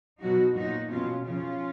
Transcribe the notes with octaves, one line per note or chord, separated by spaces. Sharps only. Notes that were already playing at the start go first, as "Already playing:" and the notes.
B2 F#3 D#4 F#4
A#2 F#3 D#4 F#4
B2 F#3 C#4 F4
C#3 F3 C#4 F4